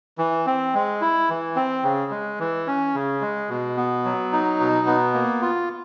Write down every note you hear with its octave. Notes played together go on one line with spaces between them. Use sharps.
E3
C4
G#3
E4
E3
C4
C#3
G#3
E3
C#4
C#3
G#3
B2
B3
F#3
D#4
B2
B3
A#3
F4